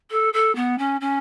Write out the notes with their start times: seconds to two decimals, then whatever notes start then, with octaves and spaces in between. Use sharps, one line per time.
0.10 A4
0.33 A4
0.55 B3
0.78 C#4
1.01 C#4